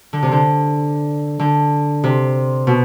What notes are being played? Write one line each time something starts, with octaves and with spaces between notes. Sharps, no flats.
D3
C3
D3
D3
C3
B2